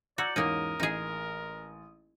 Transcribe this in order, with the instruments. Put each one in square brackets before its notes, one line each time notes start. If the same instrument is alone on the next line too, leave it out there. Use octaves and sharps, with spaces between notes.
[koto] F#4 [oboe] D5 [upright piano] A#5 E6 G#6 [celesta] G6 C#7 F#7
[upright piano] E2 G#2 [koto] A#3 C#4 D#4 [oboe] A#4 [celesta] D#6 D#7
[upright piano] A1 [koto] D#4 G#4